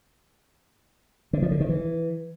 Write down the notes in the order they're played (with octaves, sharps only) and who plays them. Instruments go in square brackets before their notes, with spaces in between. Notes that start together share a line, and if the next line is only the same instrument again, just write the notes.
[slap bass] D3
F3
D3
D#3
E3